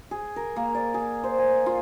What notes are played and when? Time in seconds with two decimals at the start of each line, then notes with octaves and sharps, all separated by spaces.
0.11 G#4
0.36 A#4
0.56 A#3
0.75 D5
0.94 G#4
1.24 C5
1.38 G#5
1.66 F4